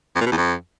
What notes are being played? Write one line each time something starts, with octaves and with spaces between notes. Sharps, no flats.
F2
A#2
B2
E2
F2